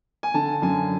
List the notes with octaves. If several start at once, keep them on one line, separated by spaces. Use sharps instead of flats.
G#5
D3 A5
F#2 G#5